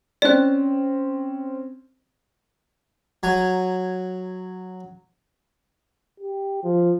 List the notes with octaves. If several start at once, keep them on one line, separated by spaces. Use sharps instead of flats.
C4 C#4 D5 F#6
F#3 G#5 A#5
G4
F3